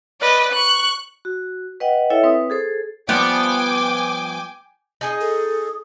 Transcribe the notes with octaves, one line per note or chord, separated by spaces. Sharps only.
B4 D5 D#5
C#6 F#6
F#4
B4 D#5 F#5 G5
E4 A4 C#5 E5 G5
C4 B4 D#6
G#4 A4 C5
F3 G3 B3 G5 G#5 D6
D#4 G#4 D#5
A4